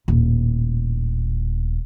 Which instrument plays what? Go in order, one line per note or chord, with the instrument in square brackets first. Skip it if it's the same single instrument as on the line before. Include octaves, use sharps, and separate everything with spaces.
[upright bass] D#1 A2